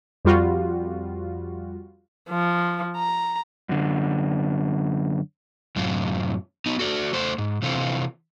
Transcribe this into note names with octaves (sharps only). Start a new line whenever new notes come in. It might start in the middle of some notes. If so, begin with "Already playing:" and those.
F2 G3 F4 F#4
F3
A#5
F#2 D3
F#2 A2 C3 F#3 F4
B3 D#4
F#4 A4 D5
A3 A4 C5
G#2
C3 E3 C4 F4 A4